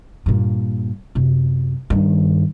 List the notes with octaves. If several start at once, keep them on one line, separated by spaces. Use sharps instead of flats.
G2 A#2
F#2 C3
G2 D#3